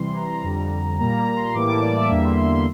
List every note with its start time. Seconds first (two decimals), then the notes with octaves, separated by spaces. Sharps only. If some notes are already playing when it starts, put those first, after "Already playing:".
Already playing: C3 E3 G3 C6
0.15 A#5
0.43 F2 D3 G3
0.98 A#2 G3 A#3 A#5
1.17 A#5
1.36 C6
1.54 A2 E3 G3 A#3 D6
1.69 A5
1.81 D5
1.95 E5
2.09 E2 D3 G3 A#3 E5
2.24 C6
2.37 C6
2.52 C6